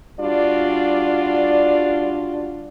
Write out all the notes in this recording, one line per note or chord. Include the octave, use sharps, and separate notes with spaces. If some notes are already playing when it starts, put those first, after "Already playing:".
G3 D4 F4 F#4 D5